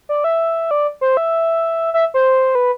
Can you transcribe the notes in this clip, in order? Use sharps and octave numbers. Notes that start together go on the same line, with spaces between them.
D5
E5
D5
C5
E5
E5
C5
B4